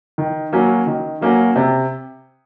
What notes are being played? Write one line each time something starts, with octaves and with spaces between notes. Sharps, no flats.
D#3
F#3 A#3 C#4 F#4
D#3
F#3 A#3 C#4 F#4
C3